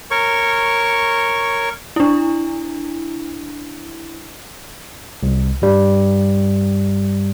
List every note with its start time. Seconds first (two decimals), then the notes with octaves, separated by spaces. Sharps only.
0.11 A#4 C#5 C#6
1.96 D4 E4
5.23 C2
5.62 G2 G3